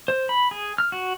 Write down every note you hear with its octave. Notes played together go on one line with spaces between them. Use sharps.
C5
B5
G#4
F6
F#4